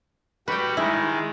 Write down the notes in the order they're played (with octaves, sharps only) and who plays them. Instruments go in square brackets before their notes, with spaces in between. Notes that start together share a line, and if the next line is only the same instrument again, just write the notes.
[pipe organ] G3 F#4 [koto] B4 G5
[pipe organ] D#3 G#3 [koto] E4